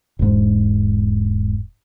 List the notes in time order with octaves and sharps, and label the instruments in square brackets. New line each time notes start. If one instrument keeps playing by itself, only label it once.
[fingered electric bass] E1 G#2